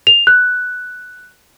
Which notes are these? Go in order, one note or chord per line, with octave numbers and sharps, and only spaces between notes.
F7
F#6